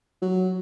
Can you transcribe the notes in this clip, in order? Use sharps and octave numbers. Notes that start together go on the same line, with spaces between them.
F#3